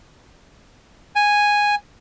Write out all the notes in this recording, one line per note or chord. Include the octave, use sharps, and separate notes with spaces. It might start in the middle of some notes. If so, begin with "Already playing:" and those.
G#5